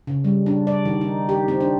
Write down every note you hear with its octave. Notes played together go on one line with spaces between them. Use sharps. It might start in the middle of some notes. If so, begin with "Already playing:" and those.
C#3
G3
D4
D5
D#3
D#4
G4
C4
D4